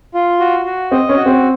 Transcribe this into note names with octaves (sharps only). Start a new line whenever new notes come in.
F4
F#4
F#4
C4 D#5
C#4
F#4
C4